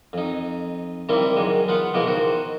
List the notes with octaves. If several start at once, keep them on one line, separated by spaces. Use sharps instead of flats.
F2 D#4
D#3 G3 A#3 C4 E4
F#2 D#3 G#3
B3 F4 F5 F#5
B2 F3 G#3 A#3 E4 A#4
D#3 F#4 C5